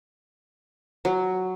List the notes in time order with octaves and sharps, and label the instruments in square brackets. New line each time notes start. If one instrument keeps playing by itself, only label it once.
[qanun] F#3